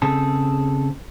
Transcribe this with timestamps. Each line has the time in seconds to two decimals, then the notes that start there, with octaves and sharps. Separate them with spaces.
0.02 C#3 C4 G#4 A4